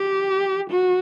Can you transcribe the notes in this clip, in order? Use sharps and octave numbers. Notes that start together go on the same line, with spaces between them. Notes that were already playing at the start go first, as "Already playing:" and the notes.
Already playing: G4
F#4